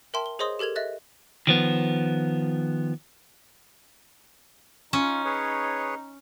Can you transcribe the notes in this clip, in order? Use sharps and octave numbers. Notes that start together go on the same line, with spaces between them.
A#4 E5 G5 A5 C6
G7
G#4 C5 C#5 D#5 C6 D#6
G4 A4 A#4 G#6 F7
D#5 E5 F#6 A6
D#3 F3 B3
C#4 D#4 F4
G#4 B4 C#5